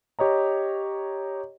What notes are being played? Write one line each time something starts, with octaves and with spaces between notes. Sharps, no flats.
G4 C#5 D#5 A#5